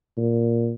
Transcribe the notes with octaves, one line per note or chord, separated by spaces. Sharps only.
A#2